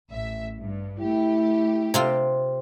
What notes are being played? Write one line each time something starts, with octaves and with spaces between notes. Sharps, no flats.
A1 E5
G2
A3 E4 G4
C3 C4 F4